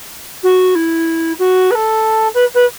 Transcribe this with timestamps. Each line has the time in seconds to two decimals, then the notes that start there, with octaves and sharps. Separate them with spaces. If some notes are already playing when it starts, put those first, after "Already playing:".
0.43 F#4
0.75 E4
1.39 F#4
1.70 B4
1.74 A4
2.34 B4
2.54 B4